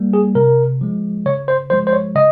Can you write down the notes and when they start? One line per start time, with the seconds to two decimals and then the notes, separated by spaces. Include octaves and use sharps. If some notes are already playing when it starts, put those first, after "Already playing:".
Already playing: G3 A#3
0.13 G#4
0.35 C3 A#4
0.81 F3 G#3
1.26 C#3 C#5
1.48 C5
1.70 F3 G#3 C5
1.87 C5
1.93 C#5
2.15 C#3 D#5